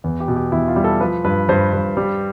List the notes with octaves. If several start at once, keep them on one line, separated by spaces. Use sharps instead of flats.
E2
G4
B2
G4
E2 E4
F4
G3
A4
F3 B4
G2 B4
G2 C5
G2
G3